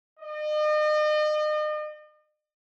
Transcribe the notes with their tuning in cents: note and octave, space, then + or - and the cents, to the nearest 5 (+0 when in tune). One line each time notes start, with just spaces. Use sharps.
D#5 -40